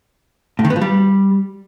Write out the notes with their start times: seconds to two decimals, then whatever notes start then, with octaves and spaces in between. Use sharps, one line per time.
0.59 A2
0.65 D#3
0.70 B3
0.76 F3
0.81 G3